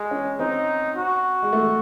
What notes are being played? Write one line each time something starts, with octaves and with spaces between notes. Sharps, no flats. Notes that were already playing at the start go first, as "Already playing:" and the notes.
Already playing: G#3
C#4
C4 D#4
F#4
G#3
A3